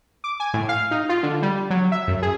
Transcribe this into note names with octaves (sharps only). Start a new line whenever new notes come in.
D6
G#5
A2
F5
D#4
F4
D3
G3
F#3
E5
F#2
G#4